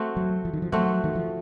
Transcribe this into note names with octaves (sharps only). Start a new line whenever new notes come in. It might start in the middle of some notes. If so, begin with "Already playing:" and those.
Already playing: A3 C4 F#4
F#3
F3
D#3
F3
F#3 A3 C4 F#4
D#3
F3